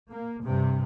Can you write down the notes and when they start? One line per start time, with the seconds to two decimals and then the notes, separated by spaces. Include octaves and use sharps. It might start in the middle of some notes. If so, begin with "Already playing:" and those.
0.11 A#3
0.43 G2 C3